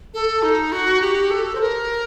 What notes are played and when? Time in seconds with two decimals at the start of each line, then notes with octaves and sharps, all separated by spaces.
0.14 A4
0.43 D#4
0.72 F#4
1.01 G4
1.30 A4
1.55 C5
1.60 A#4